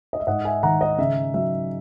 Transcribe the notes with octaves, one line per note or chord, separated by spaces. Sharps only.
D#5
E5
G#2 D#5 F#5
E5 G#5
D#3 F#5 A#5
D#5
C#3 E5
F#3 E5